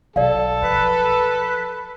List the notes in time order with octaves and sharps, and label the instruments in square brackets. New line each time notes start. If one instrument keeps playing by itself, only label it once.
[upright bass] B1 [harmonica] A4 [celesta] D5 F5
[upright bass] F3 [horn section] B4